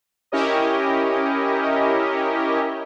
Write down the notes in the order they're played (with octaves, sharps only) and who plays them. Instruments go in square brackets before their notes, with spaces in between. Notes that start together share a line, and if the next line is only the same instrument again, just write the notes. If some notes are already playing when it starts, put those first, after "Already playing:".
[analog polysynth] C#4 E4 G4 A#4 C#5 D#5